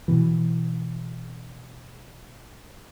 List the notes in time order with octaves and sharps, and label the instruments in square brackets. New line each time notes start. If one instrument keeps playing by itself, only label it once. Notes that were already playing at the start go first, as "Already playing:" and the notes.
[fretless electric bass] B2 E3